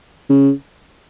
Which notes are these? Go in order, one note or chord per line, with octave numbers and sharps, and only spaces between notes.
C#3